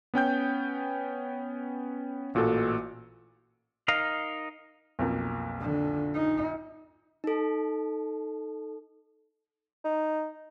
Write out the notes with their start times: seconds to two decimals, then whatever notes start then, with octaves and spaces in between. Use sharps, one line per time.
0.14 B3 C#4 G5 G6
2.34 A1 A#2 F#4 A4
3.88 D#4 A#4 D#5 F5
4.99 B1 F2 A#3
5.60 D3
6.14 D#4
7.24 D#4 A4
9.84 D#4